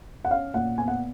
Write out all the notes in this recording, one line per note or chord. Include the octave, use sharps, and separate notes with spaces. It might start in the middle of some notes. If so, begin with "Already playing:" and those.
F#5
C#4 F5
A#2 F#5
B3 G#5
F#5